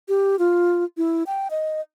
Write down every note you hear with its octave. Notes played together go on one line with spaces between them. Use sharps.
G4
F4
E4
G5
D#5